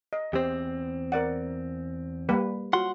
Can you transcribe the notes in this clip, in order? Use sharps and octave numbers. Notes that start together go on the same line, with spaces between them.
D#5
E2 C4 G4 C5
A#4 D5 F#5
G3 A#3 B4
F4 F#4 F#5 C6